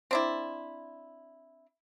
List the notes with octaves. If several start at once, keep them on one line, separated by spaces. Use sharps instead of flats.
C4 D4 E4